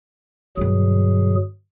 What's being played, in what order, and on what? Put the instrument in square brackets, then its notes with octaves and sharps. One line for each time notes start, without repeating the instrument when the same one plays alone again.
[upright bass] G2 D3 [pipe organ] B2 F#3 G#4